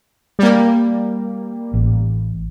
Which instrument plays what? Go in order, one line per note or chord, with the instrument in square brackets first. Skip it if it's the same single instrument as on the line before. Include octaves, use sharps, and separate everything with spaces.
[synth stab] G3 A#3
[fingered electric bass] A1